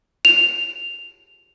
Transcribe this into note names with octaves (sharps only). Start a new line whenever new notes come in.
F7